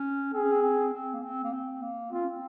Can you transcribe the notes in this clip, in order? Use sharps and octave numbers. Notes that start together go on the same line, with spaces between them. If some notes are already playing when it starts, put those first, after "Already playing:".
Already playing: C#4
C4 G#4
C#4
C4
C4
C4
A#3
C4
A#3
C4
A#3
C4 F4
C#4
C4